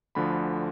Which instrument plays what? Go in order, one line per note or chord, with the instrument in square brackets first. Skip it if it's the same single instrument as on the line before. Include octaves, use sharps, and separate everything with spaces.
[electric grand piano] D2 D3 F3 B5